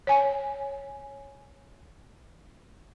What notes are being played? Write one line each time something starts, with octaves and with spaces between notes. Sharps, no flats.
C#5 G#5